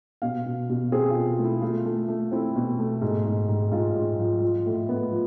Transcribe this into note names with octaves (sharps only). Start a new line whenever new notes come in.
B2 F5
B2
B2
C4 G#4
F4
B2
A3
E4
A3 F4
A3
A3
C4 E4
B2
A3
G#2
G#2
G#2
G#2 F4
G#2
F3
F3
A2
B3
F3